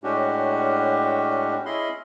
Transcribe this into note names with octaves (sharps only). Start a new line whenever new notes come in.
A2 G#3 C#4 D4 F#4 G4
C#4 E4 G#4 D#5 B5 C6